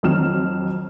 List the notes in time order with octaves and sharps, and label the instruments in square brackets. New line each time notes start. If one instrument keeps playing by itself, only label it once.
[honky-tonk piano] F2 D#3 F#3 F6 E7